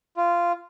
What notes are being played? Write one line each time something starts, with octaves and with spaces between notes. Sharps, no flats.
F4